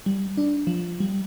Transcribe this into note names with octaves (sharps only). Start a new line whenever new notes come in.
G3
D4
F3
G3